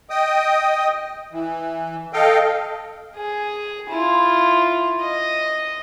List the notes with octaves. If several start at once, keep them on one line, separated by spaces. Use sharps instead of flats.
D#5 G5 D#6
E3
A4 D#5 F5 G5
G#4
E4 F4
D#5